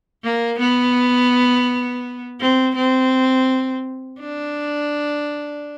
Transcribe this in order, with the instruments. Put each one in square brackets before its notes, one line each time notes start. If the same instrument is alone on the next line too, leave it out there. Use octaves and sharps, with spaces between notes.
[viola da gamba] A#3
B3
C4
C4
D4